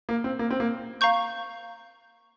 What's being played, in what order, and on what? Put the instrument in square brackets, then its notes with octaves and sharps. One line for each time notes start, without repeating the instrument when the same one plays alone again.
[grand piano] A#3
C4
A#3
C4
A#3
[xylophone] F5 A#5 C#6 G6